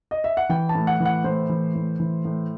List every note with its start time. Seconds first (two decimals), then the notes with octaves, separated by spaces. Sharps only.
0.11 D#5
0.24 E5
0.37 F#5
0.49 E3 G5
0.69 A5
0.75 A2
0.87 F#5
1.00 E3
1.06 F#5
1.24 A2 C5
1.49 E3
1.75 A2
2.00 E3
2.25 A2